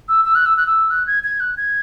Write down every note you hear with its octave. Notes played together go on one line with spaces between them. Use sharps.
E6
E6
F#6
E6
F#6
E6
F#6
G#6
G#6
F#6
G#6